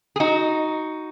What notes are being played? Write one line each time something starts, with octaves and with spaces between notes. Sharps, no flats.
G#4
D#4 F#4